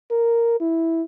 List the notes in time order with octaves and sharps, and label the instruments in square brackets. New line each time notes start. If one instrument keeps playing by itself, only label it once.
[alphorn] A#4
E4